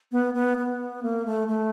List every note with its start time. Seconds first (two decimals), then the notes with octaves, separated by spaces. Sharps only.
0.12 B3
0.34 B3
0.58 B3
1.03 A#3
1.26 A3
1.48 A3